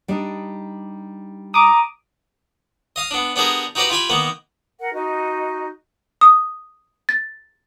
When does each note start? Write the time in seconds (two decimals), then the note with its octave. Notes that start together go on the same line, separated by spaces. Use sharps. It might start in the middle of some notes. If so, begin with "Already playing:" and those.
0.08 G3 D4 D#4
1.54 A#5 D6 D#6
2.96 D#5 F5 D#6
3.11 B3 D4
3.36 B3 D4 G4 G#4 A#4
3.75 D#4 F#4 G4 B4 D5 D#5
3.90 F4 G4 G#5 B5
4.10 D#3 A#3 B3
4.80 A#4 F#5
4.93 D#4 F#4 D#5
6.21 D#6
7.09 A6